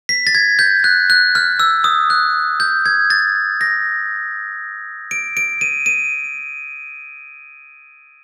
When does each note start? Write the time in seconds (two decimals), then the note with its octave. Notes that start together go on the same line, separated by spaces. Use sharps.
0.09 B6
0.27 A6
0.35 G#6
0.59 G6
0.84 F#6
1.10 F#6
1.35 F6
1.59 E6
1.84 D#6
2.10 F#6
2.60 G6
2.86 G#6
3.10 A6
3.61 A#6
5.11 D7
5.37 D7
5.61 D#7
5.86 D#7